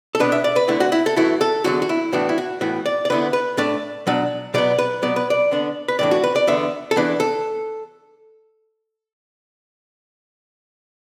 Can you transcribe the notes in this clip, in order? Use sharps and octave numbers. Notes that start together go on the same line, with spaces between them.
A4
B2 B3 D4 B4
E5
D5
B4
D2 D3 A3 E4
F#4
E4
A4
F#2 E3 A3 E4 F#4
A4
E2 D3 F#3 F#4
F#4
E4
A2 E3 B3 D4 F#4
E4
F#4
A2 E3 B3 F#4
D5
D5
D2 D3 B3 E4 B4
B4
A2 A3 D4 D5
B2 F#3 D4
B2 F#3 B3 D5
B4
B2 F#3 B3 D5
B4
D5
D3 B3 D4
B4
A2 E3 A3 D4 D5
F#4
B4
D5
E2 D3 B3 E5
A4
E2 E3 D4 B4
A4